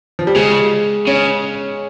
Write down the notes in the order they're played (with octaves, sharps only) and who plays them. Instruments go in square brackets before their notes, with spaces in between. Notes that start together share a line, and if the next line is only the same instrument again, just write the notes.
[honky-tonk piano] F3
G3
[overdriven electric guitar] C#3 [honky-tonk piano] G#3
[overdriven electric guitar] C#3 [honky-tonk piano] C#4